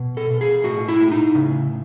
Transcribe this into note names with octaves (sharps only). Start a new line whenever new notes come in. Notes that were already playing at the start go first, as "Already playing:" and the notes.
Already playing: B2
A4
B2
G#4
A2 F#4
E4
A2
D#4
C#3